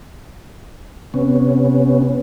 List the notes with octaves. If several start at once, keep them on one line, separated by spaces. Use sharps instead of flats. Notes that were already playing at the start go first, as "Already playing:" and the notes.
C3 B3 C#4